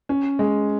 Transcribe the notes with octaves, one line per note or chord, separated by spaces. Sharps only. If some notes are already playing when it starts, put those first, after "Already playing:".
C#4
G#3